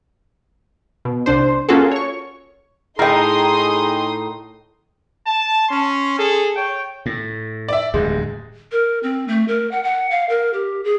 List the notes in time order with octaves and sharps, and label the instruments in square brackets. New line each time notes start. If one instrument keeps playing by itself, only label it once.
[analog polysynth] B2
C2 D4 C5
A#3 C#4 F4 F#4 G#4 A4
C#5 C#6
[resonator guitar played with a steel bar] A2 D#5 [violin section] D#4 C6 D#6 [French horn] G#4 [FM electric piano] G5 A#5
[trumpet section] A5
C#4 C6
G#4 A4
C#5 G5
[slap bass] A2
[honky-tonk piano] D5 E5
[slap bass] D1 E2 G2 [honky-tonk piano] G#3
[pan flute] A#4
C4
A3
A#4
F#5
F#5
F5
A#4
G4
G#4